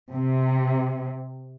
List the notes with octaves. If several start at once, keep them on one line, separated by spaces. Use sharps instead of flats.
C3